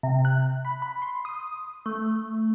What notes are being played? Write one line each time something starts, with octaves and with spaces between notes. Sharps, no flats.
C3
F#6
B5
B5
C6
D#6
A3